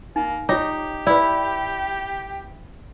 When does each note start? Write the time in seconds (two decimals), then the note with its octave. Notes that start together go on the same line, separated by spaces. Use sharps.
0.16 A#3 D#4
0.49 D#4 F4 G4 C#5 D6
1.07 E4 B4 D5